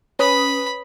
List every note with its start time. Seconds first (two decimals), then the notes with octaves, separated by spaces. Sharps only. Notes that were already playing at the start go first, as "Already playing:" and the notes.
0.19 C#4 B4 B5 D#6